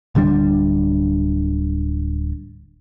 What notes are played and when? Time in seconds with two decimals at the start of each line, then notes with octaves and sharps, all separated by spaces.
0.15 D1 D3 G3 D4